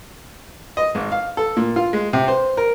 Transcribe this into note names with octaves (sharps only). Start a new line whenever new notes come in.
D#5
G#1
F5
A4
A#2
F4
G#3
C3
C5
A#4